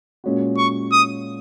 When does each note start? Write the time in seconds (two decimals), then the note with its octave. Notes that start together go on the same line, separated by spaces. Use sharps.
0.24 A#2 G#3 C#4 F#4
0.58 C#6
0.92 D#6